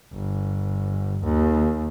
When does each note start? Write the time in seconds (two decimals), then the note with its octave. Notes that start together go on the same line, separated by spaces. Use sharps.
0.14 G1
1.24 D#2